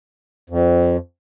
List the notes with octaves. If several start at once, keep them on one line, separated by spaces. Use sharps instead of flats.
F2